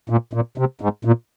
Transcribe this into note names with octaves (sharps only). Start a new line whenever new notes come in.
A#2
A#2
C3
G#2
A#2